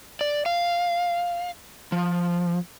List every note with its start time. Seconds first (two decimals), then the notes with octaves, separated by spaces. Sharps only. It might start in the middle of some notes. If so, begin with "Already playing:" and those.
0.21 D5
0.46 F5
1.92 F3